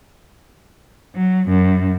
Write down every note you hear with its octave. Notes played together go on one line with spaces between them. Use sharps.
F#3
F#2